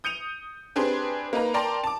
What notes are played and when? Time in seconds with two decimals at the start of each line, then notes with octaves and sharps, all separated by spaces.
0.04 D#6 G6 C#7 D#7 F7
0.76 C4 D4 G4 G#4 B4 C6
1.33 A#3 D#4 B4 A#5
1.54 A#4 D5 G5 A5 A#5 C6
1.84 A5 D6